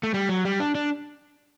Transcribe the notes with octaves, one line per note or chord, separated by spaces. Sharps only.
A3
G3
F#3
G3
D4
D4